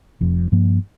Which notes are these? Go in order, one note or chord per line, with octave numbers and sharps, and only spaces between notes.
F1 F2 C3
G2 F3 A#3